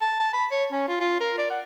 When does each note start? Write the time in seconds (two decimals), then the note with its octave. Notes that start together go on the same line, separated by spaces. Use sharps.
0.02 A5
0.20 A5
0.34 B5
0.51 C#5
0.72 C#4
0.88 F4
1.00 F4
1.20 A#4
1.38 D5
1.50 F#5